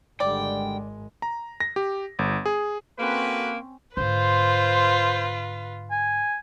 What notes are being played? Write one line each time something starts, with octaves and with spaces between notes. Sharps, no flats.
G#1 D3 G3 G#3 D5 G5
A#5
A#6
G4
G1
G#4
A#3 C4 C#4 F#4 A4 B4
G#2 D3 F4 B4 C5
G#5